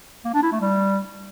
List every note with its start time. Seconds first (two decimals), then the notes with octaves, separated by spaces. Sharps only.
0.25 A#3
0.34 D4
0.43 E4
0.52 A3
0.61 G3